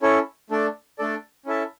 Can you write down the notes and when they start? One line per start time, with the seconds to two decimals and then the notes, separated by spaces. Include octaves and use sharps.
0.02 C#4 E4 A4 C#5
0.50 A3 D4 A4 D5
0.99 A3 D4 A4 D5
1.46 C#4 E4 A4 E5 A5